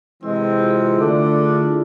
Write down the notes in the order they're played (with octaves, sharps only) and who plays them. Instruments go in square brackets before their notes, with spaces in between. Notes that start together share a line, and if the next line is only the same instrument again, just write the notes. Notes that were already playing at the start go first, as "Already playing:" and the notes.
[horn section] C3 E3 G#3 C4 [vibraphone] E4
[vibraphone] F4
G#4
F4
[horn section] D3 A3 D4
[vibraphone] G#4
F4
E4 G#4